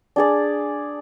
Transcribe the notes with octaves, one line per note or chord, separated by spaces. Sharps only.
D4 G#4 D5